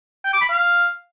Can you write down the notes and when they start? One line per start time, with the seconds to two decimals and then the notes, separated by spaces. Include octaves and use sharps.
0.25 G5
0.33 D6
0.41 B5
0.49 F5